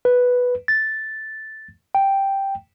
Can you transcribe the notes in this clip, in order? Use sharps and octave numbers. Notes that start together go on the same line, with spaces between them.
B4
A6
G5